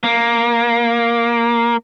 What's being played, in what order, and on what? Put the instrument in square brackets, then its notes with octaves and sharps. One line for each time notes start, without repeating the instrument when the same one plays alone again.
[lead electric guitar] A#3